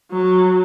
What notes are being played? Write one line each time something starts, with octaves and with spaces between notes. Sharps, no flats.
F#3